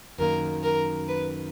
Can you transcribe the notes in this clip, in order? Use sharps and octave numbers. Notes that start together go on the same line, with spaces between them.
F#2 D#3 A#3 A#4
A#4
B4